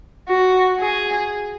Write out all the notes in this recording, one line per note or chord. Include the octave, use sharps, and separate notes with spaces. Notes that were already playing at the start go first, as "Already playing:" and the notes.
F#4
G#4